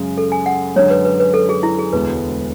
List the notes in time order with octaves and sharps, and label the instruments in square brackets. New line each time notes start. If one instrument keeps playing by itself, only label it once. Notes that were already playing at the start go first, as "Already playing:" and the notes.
Already playing: [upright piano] F#2 C#3 G#3
[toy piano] A4
G#5
F#5
[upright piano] F#2 D3 G#3 [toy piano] C#5
[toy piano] B4
B4
B4
A4
G#4
E4
G#4
[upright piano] E1 D2 D3 G#3 B3 [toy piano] B4